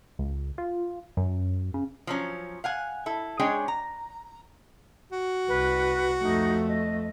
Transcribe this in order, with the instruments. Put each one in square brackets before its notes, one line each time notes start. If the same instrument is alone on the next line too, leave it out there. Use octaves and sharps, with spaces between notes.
[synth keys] C#2
F4
F#2
C#3
[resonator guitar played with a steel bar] F3 F#3 C#4
F5 F#5 G#5
E4 A4
G#3 C#4 D4 G#4 C#5 G5
A#5
[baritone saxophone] F#4
[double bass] C2 [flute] B4
[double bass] F2 A3 [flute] D#4
[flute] D#5